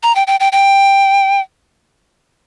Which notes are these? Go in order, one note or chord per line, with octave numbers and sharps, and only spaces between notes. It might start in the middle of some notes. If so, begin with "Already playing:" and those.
A#5
G5
G5
G5
G5